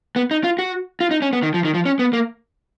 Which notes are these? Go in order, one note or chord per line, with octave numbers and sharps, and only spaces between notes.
B3
D#4
F4
F#4
F4
D#4
C#4
B3
D#3
F3
D#3
F3
C#4
B3
A#3